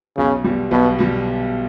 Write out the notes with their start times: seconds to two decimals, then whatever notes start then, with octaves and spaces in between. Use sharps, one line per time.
0.18 B1 C#3
0.44 B2 G3
0.71 B1 B2
0.99 B2 G3